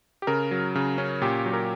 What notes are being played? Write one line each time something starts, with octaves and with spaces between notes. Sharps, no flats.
G4
C#3 A#4
F#3
C#3
C#4
A#2 G4
F#3
A#4